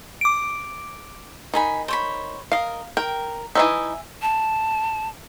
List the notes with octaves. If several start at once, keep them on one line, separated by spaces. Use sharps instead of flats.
D6 D7
D#3 D#4 G#5 B5
C5 C#5 B5
A#4 D#5 F5
A#4 G5
E3 F#3 D#4 E5 G#5
A5